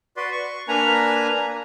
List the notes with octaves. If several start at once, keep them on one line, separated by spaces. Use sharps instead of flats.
F#4 B4 D5 C6
C#6
A#3 D4 B4 G#5 A#5